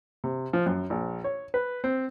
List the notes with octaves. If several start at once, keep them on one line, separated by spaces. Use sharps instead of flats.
C3
F3
F#2
A#1
C#5
B4
C4